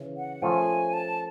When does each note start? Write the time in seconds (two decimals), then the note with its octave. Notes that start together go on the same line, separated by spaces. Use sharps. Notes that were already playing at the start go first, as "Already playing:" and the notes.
Already playing: C#3 E3
0.17 F#5
0.42 F3 A3 C#4 F4 A#4 G#5
0.93 A5